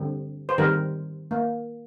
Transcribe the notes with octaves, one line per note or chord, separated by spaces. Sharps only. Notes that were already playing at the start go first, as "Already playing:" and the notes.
Already playing: D3 G3 C4
C5
D#3 G3 C4 A#4
A#3